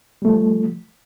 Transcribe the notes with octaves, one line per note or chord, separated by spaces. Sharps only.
F3 G3 A3